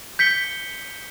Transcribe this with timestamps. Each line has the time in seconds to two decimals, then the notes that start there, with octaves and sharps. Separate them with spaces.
0.19 G6 B6 C#7 G7